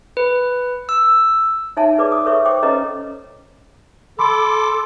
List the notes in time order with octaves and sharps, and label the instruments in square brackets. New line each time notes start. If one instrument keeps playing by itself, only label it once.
[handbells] B4
E6
[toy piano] D#4 C#5 E5 G#5 A5
G#4 B4 C#5 D5 D6
D#6
A4 B4 C#5 E5 C#6
C5 G5 D6
C#4 A4 B4 C#5 D#5 A#5
[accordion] A4 D6 [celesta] B5 C6